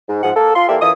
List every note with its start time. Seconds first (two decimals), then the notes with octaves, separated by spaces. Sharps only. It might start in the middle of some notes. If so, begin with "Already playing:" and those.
0.09 G#2
0.23 G#2 F3 G#4 F#5
0.36 A#3 A4
0.56 F4 C6
0.69 E3 A#3 G4 A4 D5 E5
0.81 F#2 E3 F4 A4 D#6